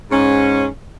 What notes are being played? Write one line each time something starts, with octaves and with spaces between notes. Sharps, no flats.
G#2 C#4